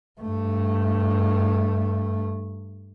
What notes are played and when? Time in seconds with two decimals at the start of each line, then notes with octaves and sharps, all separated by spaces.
0.21 G2 A3